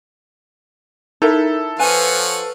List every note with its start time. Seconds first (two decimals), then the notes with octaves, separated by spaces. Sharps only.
1.22 D#4 E4 A4 A#4 E5
1.79 F3 B4 C#5 F#5 G#5